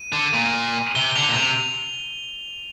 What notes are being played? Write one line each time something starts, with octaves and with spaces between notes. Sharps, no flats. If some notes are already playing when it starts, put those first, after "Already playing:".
Already playing: D#7
D3
A#2
C3 G7
G7
D3 F7
A#2
C3 F7